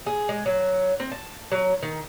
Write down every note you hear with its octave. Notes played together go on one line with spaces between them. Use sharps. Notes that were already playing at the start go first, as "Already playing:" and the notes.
G#4
G#3
F#3
C4
A5
F#3
D#3